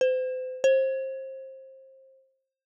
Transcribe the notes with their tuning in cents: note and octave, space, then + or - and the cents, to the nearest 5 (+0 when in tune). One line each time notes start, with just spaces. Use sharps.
C5 -35
C5 +25